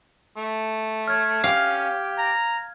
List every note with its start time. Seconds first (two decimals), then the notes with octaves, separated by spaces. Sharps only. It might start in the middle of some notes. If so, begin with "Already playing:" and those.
0.37 A3
1.08 C#5 F6 G#6
1.44 C#4 G4 F5
2.18 A#5